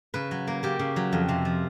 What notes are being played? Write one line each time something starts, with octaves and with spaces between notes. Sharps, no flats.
C#3 B4
F#3
A#3
C#3 G4
C#3
F#3
F2
C3
F3